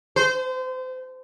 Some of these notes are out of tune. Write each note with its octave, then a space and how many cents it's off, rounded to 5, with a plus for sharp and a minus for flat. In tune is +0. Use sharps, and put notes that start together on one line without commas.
C5 -30